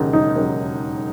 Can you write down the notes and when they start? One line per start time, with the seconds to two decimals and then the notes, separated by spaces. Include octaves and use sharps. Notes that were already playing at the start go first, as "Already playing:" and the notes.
Already playing: E1 D#2 C#3 F#3 D#4
0.13 E1 D#4
0.36 D#2 C#3 F#3